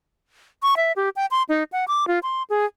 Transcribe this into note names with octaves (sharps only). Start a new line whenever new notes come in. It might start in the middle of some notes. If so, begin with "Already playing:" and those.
C#6
E5
G4
G5
C6
D#4
F#5
D6
F4
C6
G#4